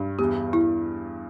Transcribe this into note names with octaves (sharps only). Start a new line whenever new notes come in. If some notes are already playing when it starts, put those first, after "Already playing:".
Already playing: G2
E2 G4
E4